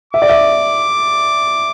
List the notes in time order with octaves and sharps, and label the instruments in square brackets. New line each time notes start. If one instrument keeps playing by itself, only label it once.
[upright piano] E5 [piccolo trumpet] D6
[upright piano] D5
E5